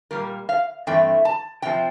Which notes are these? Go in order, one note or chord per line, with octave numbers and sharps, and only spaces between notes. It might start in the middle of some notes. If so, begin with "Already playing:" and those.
A#2 G3 A#3 A#4
F5
G2 E3 A3 C4 G5
A5
C3 F3 C4 G5